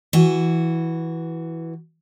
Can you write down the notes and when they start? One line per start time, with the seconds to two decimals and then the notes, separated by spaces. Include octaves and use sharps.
0.13 E3 F#4